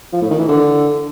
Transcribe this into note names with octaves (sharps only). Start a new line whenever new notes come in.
F3
A2
D#3
E3
D3